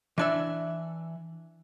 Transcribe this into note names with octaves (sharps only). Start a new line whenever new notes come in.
E3 D4 E5